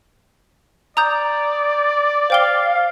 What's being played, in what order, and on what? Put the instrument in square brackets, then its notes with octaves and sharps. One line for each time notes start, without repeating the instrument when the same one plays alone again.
[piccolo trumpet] D5 [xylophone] A#5 D#6 G6
[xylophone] C5 G5 G7 [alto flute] F5